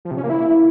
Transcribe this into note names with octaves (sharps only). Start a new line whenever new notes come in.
F3
C3
C#4
A#3
E4